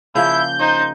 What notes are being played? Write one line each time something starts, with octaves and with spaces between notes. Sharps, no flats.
C#3 F3 A#3 E4 G6
D#4 C5